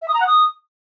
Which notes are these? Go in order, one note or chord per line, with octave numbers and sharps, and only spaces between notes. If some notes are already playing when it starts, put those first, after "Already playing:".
E5
D#6
A#5
F#5
D#6